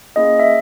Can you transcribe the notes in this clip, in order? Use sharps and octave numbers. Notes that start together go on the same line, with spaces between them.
A#3 C#4 E4 G#4 D#5
E5